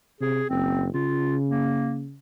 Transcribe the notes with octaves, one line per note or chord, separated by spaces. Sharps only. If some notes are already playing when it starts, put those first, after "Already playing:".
C3 G#4
F#1 C4
C#3 F4
A#3